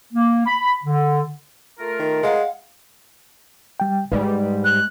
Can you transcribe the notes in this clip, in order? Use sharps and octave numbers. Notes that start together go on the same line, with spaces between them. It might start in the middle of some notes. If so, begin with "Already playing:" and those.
A#3
B5
D3
A3 F4 A#4
D#3
G#3 F5 F#5
G3 G5
G#2 G3 G#3 B4
F#6